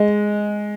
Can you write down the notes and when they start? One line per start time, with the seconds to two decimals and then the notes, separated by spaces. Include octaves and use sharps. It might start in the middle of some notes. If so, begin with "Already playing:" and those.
Already playing: G#3